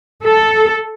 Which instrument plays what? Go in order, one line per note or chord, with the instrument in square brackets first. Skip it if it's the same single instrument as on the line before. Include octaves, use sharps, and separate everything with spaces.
[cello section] A4